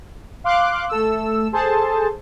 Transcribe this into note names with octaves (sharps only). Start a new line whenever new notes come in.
F5 C6 D6 F#6
A3 A4 E6
G#4 A4 C5 A5